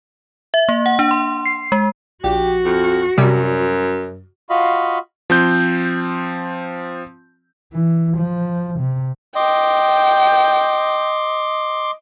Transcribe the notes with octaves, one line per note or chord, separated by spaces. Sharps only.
E5
A#3
F#5
D4
C6
C7
G#3
A#1 F#4 G4
F2
F#2 C3 G3
F4 F#4 D#5 F5 B5
F3 C4 G6
E3
F3
C3
D#5 G5 C6 D6